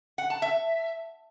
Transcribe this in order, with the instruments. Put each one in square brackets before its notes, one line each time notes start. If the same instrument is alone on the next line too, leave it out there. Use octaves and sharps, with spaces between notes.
[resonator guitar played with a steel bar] F#5
A5
E5